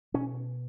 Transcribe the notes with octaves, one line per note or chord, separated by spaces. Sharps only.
B2 C#4